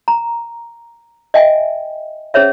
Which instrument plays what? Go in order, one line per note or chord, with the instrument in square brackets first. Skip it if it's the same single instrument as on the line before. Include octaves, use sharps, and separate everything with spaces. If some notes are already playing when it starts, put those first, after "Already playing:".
[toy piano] A#5
D#5 E5 G5 G#5
C#4 G#4 C5 C#5 E5